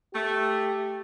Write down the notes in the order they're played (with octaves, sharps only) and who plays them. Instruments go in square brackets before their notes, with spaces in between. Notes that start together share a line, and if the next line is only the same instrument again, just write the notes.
[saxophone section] A3 [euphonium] G4